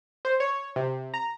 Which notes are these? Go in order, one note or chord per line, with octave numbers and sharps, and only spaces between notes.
C5
C#5
C3
A#5